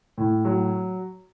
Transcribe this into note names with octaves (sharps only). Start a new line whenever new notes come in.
A2
F#3